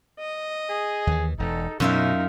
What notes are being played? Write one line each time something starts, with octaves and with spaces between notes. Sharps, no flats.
D#5
G#4
D#2 E3
E1 D#4 A4
F#2 B2 C#4 D#4 F4 E5